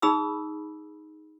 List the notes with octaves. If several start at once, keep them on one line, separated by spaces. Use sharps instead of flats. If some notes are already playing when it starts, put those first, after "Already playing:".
D#4 G#4 B5 D#6 E6